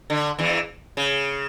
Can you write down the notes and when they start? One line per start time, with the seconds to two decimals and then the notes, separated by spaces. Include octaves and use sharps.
0.10 D3
0.39 E2 E3
0.97 C#3